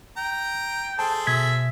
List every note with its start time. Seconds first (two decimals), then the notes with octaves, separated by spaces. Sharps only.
0.17 G5 A#5
0.99 G#4 A4 C5 A5
1.27 B2 E5 G#6 B6